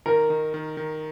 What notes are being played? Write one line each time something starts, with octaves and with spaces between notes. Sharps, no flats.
D#3 A#4
D#3
D#3
D#3